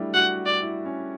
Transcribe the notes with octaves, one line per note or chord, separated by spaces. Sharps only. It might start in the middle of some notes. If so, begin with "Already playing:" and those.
Already playing: F#3 G3 A3 D4 E4
F#4 F#5
D5
E4
C#4